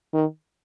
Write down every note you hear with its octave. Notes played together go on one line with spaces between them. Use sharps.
D#3